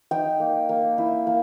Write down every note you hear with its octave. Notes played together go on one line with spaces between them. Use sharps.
D#4 G5
A#3
A#3
E4
A#3